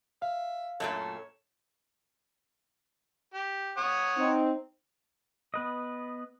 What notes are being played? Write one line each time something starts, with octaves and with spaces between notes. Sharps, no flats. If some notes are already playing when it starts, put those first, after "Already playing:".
E5 F5
F#2 A#2 A3 A4 C#5
G4
C#5 F#5 D#6
C4 D#4
B3 B4 D#5